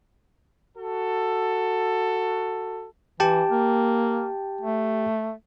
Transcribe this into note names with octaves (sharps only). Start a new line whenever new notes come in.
F#4 A4
E3 G4 G5 A5
A#3
A3